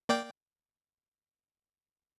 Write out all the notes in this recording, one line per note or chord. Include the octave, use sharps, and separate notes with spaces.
A#3 D5 G5